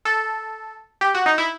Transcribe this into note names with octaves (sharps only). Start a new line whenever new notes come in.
A4
G4
F#4
D#4
E4